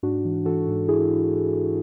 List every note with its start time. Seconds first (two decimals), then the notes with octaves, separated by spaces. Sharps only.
0.03 G#2 D4 F#4
0.25 E3
0.45 E3 F#4 A4
0.68 G#2
0.88 E4 G#4